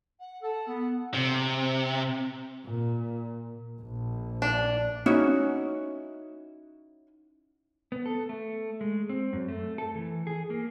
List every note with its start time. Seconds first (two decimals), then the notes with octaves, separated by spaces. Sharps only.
0.19 F#5
0.42 A4 F#5
0.67 B3
1.14 C3
2.65 A#2
3.82 A#1
4.42 D4
5.06 C#4 D#4 E4 F#4
7.92 B3
8.06 A4
8.29 A3
8.81 G#3
9.09 C4
9.33 F#2
9.48 A3
9.78 A4
9.95 E3
10.27 G#4
10.50 A#3